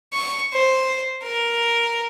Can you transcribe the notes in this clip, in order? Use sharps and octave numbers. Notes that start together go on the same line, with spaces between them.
C#6
C5
A#4